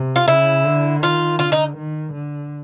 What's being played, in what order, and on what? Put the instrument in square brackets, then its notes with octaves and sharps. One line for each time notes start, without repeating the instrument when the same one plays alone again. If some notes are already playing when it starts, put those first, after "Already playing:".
Already playing: [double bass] C3
[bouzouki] F4
[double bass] C#3 [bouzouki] E4
[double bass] D3
[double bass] D#3 [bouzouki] F4
[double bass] D3 [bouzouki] F4
[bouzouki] D#4
[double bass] D#3
D3